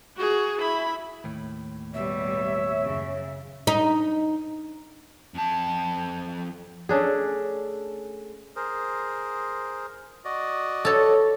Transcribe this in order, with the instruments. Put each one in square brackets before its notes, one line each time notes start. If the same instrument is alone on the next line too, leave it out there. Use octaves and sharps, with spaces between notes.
[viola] F#4 G#4
E4 B5
[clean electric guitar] D#2 A2
[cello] B2 G3 [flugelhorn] C#5 [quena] E5
[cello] F#2 C#3
[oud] D#4
[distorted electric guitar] F2 A5
[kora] A3 C#4 D4 G#4
[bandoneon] G#4 A#4 C5
F#4 D5 D#5
[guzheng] A4 C#5